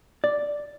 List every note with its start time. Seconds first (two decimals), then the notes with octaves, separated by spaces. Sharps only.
0.24 D5